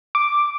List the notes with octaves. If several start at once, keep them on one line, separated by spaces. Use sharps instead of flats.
D6